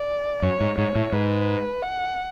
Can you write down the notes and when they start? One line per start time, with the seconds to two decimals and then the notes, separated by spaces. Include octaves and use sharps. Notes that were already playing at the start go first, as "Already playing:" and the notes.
Already playing: D5
0.42 F#2 C#5
0.61 G#2
0.78 G#2 C#5
0.95 A2
1.12 G#2 B4
1.82 F#5